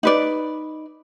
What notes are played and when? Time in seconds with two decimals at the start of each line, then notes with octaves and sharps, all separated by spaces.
0.03 D#4 B4 D5